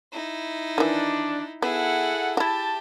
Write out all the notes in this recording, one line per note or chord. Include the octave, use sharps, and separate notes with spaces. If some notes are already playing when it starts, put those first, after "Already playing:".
D#4 E4
D#3 E3 D4
B3 E4 G#4 A4 F#5
E4 F#4 G4 A5